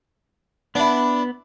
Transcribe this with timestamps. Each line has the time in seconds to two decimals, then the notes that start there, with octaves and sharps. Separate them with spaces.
0.75 B3 D4 E4